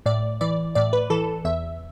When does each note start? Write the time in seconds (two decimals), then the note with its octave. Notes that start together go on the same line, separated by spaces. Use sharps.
0.06 A2 D5
0.41 E3 D5
0.75 A2 D5
0.93 B4
1.10 E3 A4
1.45 E2 E5